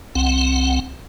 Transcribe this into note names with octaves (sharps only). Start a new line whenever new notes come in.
C2 C4 F#5